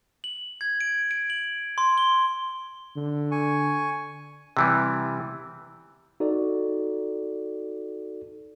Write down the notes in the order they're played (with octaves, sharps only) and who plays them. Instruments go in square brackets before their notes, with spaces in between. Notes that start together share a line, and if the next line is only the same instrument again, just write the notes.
[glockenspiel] F#7
G#6
D7
D7
F#7
C6
G7
[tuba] D3
[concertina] G#5 C#6
[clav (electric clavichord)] C3 E3 G3
[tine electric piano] D#4 F#4 A4 D5